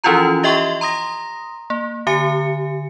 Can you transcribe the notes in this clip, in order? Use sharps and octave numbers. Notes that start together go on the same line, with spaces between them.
E3 F3 C#4 E4 F4 A#5
G4 D#5 E5 G5 C6 C#6
A#5 C6 D#6 A#6
A#3
D3 G4 G#5 C#7